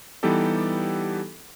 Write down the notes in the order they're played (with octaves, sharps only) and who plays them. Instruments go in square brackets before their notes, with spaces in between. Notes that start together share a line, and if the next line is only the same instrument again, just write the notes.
[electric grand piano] E3 G3 B3 D#4 G4 A4